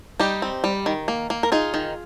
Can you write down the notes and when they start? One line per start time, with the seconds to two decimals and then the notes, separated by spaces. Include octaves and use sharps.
0.20 G3 D#4 G4
0.42 C4
0.64 G3
0.86 D#3
1.08 A#3
1.30 A#3
1.43 A#4
1.52 D#4 F4 G#4
1.74 D#3